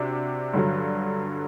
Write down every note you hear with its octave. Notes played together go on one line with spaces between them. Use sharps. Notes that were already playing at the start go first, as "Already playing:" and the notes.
Already playing: C3 D4 F#4
G2 D3 F#3